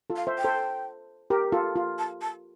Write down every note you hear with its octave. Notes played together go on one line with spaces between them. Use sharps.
F4 A4
F5
C5 E5
G5
A4 C5
G4 A#4
F4 A4
F4
A5
A5